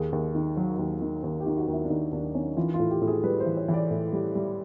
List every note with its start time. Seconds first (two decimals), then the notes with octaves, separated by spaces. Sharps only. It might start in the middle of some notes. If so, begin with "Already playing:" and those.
Already playing: D#2 G#4
0.12 D#2
0.35 D#3
0.57 F#3
0.79 D#2
1.01 D#3
1.23 D#2
1.40 G4
1.46 D#3
1.57 F#4
1.68 D#2
1.73 E4
1.84 D4
1.90 D#2 D#4
2.12 D#2 D4
2.35 D#3 C#4
2.57 E3 F4
2.74 F4
2.80 A2
2.90 G4
3.02 A2
3.07 G#4
3.24 G3 B4
3.40 C5
3.46 E3
3.57 C#5
3.68 E3
3.74 D5
3.91 A2
4.13 G3
4.35 G3